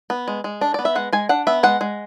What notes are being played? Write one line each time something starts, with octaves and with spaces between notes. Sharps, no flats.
B3
G#3
G#3
D4
B3 D5
E5
G#3 F#5
G#3 G#5
D4 F#5
B3 E5
G#3 F#5
G#3